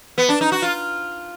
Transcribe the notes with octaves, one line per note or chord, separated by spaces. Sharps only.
B3
D4
D#4
F#4
F4